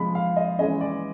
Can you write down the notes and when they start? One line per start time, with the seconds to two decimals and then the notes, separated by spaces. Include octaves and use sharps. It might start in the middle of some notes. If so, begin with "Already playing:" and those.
Already playing: C3 F3 G#3 B5
0.15 F5
0.36 D#5
0.59 E3 G#3 C#4 D#5
0.81 D5